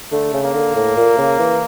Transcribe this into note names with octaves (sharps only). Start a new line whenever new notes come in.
D3 A3
C#3
A#3
D3
A2
A#2
C#3
E3